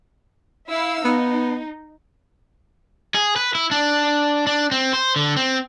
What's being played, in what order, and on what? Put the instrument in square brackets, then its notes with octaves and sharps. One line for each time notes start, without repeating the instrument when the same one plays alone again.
[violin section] E4 F5 E6
[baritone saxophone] B3 [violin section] D#4
[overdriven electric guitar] G#4
B4
E4
D4
D4
C4
C5
D3
C4